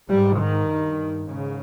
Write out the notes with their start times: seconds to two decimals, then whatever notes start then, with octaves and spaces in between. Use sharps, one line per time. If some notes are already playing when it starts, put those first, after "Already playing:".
0.09 G#2 G3
0.39 D#3
0.68 G2
1.27 G#2 C#3